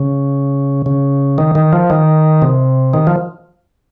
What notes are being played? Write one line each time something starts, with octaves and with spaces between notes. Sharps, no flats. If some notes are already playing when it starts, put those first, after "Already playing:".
Already playing: C#3
C#3
D#3
D#3
F3
D#3
C3
D#3
F3